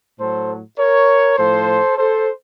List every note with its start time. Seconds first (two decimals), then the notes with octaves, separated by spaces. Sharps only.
0.19 A2 F#3 A4 C5
0.79 A#4 C#5
1.38 A2 F3 A4 C5
1.98 A4 C5